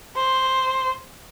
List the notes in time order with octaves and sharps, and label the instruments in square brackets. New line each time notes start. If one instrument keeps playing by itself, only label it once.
[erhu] C5